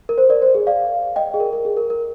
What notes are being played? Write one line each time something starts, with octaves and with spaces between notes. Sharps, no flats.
A#4
C5
A#4 D5
C5
G#4
D5 F5
D#5 G5
G#4
A#4
A#4
G#4
A#4
A#4